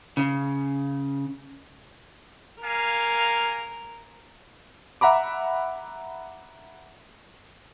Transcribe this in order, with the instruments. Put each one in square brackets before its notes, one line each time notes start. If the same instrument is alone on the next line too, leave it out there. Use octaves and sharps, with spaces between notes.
[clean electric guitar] C#3
[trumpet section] A#3 F5 G#5 [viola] A#4
[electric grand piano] E5 F#5 A#5 B5 D6